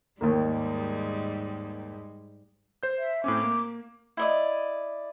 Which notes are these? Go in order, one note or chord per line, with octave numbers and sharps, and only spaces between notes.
D#2 G#2 D#3 G3 G#3 A#3
C5 G6
E5
A2 C4 C#4 D6
A#3
E4 D5 D#5